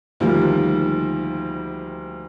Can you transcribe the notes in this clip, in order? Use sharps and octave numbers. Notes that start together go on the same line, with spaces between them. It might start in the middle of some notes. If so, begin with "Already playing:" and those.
D2 D#3 F3 G3 A#3